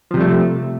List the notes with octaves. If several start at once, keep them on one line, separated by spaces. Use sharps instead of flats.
C3 F3 G3 A3